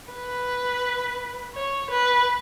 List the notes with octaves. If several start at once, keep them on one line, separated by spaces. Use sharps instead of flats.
B4
C#5
B4